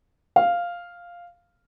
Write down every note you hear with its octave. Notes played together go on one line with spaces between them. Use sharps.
F5